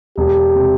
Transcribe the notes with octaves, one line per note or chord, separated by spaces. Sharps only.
E1 G4
C3